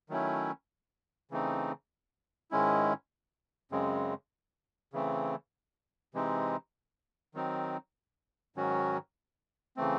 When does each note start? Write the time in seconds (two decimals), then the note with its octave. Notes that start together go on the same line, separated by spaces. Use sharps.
0.09 D#3 F#3 A3 C#4 E4
1.31 C#3 E3 A3 C4 D#4
2.51 G#2 D#3 G#3 C#4 E4
3.72 F#2 C#3 G#3 C4
4.93 C#3 E3 A3 C4
6.14 C3 E3 G#3 C4 D#4
7.34 D#3 F#3 C4 D#4
8.56 G#2 D#3 F#3 C#4 F#4
9.77 C#3 E3 A3 C4